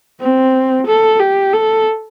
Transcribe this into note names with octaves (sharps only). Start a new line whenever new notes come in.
C4
A4
G4
A4